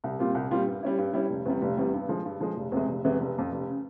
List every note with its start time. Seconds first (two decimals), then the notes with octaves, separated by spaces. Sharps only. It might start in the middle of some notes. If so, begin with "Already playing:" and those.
0.04 C2
0.19 A#2 G3 C4 F4
0.35 C2
0.50 A#2 G3 C4 F4
0.66 G2
0.83 G3 C#4 E4
0.98 G2
1.13 G3 C#4 E4
1.30 F1
1.45 E2 C3 G3
1.62 F1
1.77 E2 C3 G3
1.94 G2
2.09 F3 G#3
2.25 G2
2.40 F3 G#3
2.56 F1
2.72 E2 C3 E3 G#3
2.88 F1
3.04 E2 C3 E3 G#3
3.20 F1
3.35 F2 C#3
3.52 F1
3.68 C#3